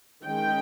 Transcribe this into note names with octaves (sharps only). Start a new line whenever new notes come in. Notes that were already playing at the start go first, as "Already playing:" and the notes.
D#3 G#3 C#4 G5